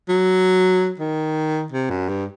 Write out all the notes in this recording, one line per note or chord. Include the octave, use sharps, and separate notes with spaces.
F#3
D#3
C3
F#2
G2